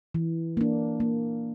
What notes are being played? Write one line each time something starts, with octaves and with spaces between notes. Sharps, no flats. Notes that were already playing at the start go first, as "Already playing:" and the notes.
E3
A#3 D4
A#3